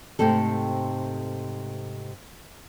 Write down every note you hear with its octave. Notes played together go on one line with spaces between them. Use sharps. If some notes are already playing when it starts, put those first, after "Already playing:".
G#2 C3 A3 C4 A4